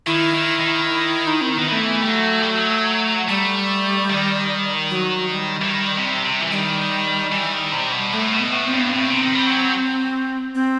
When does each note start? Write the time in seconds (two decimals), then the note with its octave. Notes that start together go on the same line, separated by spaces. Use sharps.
0.06 D#3 E4
0.34 D#3
0.60 D#3
1.27 D#4
1.41 C4
1.55 D#3 B3
1.68 E3 A3 B3
2.02 G3
2.08 F#3
2.42 G3
2.49 F#3
3.29 G3 A3
4.10 D#3
4.90 F#3
5.31 G3
5.62 E3
5.71 D#3
5.97 C3
6.25 C3
6.41 E3
6.51 D#3 G3
7.32 E3
7.53 D#3
7.72 C3
7.92 B2
8.12 A2 A3
8.33 B2
8.39 B3
8.52 A2
8.66 C4
8.73 G2
8.79 B3
8.92 A2 C4
9.10 C3
9.20 D#3
9.35 G3
9.47 F#3
10.55 C4